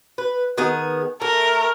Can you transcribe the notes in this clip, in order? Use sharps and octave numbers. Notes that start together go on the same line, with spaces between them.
B4
D#3 B3 G#4
A3 A#4